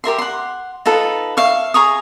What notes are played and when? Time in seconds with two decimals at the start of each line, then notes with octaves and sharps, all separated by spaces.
0.04 G4 A#4 E5 C6
0.18 F#5 C6
0.86 D#4 F4 A4 B4
1.37 E5 F5 C#6
1.74 G#4 A#5 C#6 D#6